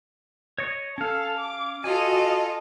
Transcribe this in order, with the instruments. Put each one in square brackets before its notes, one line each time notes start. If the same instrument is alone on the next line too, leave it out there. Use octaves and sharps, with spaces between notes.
[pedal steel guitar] C#5 D#5 C#6
[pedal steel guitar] C#4 F5 [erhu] A4
[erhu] D6
[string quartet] F4 A4 [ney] F#4 [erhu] D#5 [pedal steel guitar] G#5